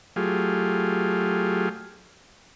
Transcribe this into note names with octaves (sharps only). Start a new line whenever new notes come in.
F#3 A3 F4 G4 G#4